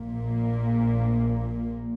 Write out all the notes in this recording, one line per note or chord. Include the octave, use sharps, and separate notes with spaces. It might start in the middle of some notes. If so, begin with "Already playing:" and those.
Already playing: A#1 A#2 A#3